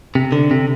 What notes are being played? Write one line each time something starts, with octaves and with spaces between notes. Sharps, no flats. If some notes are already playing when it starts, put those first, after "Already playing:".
C3
D3
C3